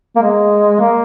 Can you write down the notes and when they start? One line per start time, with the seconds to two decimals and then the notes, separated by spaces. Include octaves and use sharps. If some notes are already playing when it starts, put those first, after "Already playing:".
0.16 A#3
0.22 G#3
0.80 A#3